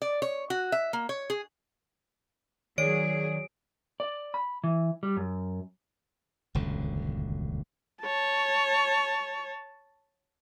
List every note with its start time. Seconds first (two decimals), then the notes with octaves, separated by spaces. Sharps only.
0.02 D5
0.22 C#5
0.50 F#4
0.72 E5
0.93 A#3
1.09 C#5
1.30 G#4
2.78 D#3 F#3 G#4 C#5 D5 D7
4.00 D5
4.34 B5
4.64 E3
5.03 G3
5.17 F#2
6.55 D#1 C#2 F#2 D3
8.03 C#5 A5